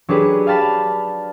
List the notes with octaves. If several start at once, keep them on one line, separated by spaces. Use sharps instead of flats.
F#3 D4 G4 G#4 B4
F5 G5 A5 B5